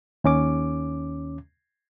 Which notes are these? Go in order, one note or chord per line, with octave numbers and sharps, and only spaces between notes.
D#2 C#4 D6